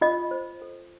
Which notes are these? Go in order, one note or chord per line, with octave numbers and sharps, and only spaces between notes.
F4 D#5
C5
A4